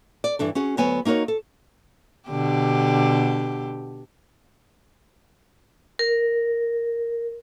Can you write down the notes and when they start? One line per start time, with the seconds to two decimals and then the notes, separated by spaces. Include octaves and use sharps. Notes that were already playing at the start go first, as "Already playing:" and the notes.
0.24 D5
0.39 G2 E3 D4 A4
0.55 C#4 F#4 G#4
0.77 D2 F#3 B3 C#5 G#5
1.05 A#3 D#4 F#4 A#4 C#5
1.28 A4
2.29 B2 D3 G4
5.99 A#4